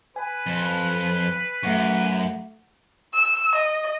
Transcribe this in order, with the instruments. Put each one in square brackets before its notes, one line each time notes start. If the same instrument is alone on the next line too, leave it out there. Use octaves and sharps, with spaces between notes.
[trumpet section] B4 [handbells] G#5
[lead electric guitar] F2
[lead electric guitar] F#2 [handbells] A3 F#5 C#6
[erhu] E6
D#5